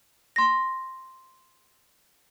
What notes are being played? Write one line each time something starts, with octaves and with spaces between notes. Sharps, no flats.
C6 A#6